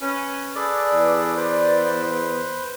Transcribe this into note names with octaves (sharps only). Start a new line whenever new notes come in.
C#4 B4
G#4 A4 B4 D5
E2
B4 C5